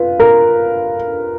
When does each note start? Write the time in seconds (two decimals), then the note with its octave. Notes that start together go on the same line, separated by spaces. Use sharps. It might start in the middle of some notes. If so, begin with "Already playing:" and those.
Already playing: F4 B4
0.20 A#4